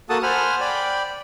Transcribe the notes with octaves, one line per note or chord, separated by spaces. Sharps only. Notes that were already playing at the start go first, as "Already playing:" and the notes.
A#3 F#4 A4 F#5 A5 D#6
C5 F#5 G#5 B5 F6
D5 G5 B5